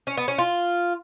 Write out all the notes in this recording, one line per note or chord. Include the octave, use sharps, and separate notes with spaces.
C#4
B3
C#4
F4